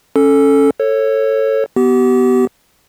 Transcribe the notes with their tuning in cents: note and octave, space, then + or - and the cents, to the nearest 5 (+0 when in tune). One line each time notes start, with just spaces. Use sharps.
C#4 -5 A4 +0
A4 +15 C#5 -15
B3 +0 G4 -35